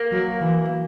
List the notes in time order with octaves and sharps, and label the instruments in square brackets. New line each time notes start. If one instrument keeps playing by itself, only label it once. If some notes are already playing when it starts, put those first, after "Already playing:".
Already playing: [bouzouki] A#3
[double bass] F#3
E3